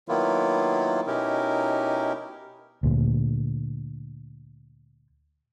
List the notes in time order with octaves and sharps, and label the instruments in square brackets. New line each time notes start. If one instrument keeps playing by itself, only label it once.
[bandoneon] D#3 F#3 A#3 B3 E4 F4
B2 C#4 D#4 E4 G4 A#4
[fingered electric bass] D2 A#2